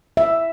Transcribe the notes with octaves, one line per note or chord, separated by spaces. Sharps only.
E5